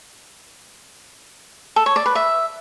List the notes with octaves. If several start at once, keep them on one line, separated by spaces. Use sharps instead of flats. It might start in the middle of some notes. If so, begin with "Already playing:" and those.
A4
C#5
D5
B4
E5